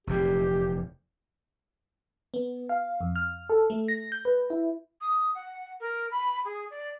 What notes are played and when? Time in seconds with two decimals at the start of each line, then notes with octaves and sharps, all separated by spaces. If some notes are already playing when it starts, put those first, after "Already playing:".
0.07 F1 E2 A#2 G4
2.34 B3
2.69 F5
3.01 F2
3.16 F6
3.50 A4
3.70 A3
3.88 A#6
4.12 G6
4.25 B4
4.50 E4
5.01 D#6
5.35 F#5
5.80 A#4
6.11 B5
6.45 G#4
6.70 D5